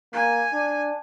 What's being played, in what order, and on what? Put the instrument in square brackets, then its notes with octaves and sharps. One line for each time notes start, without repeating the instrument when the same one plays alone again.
[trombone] A#3 [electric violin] G#5
[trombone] D4